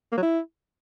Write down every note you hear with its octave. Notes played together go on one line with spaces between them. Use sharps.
A#3
F#3
E4